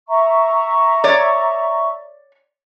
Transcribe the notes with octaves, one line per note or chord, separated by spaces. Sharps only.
E5 A#5 C#6
C#5 D5